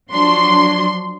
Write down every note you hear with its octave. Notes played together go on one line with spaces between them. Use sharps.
F3 F#3 D4 C6